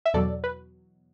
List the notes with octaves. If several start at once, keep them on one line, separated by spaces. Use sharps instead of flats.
E5
E2 B2 F#3 A4 D5
B4